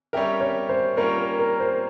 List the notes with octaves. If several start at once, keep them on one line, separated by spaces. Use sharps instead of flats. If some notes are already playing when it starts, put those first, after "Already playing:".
G3 C#4 G4 A#4 E5
C#5
C5
G3 A#3 C#4 F4 A#4
A#4
A#4
C5